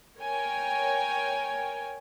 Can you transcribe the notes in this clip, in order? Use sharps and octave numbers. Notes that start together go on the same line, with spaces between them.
A#4 C#5 G5 G#5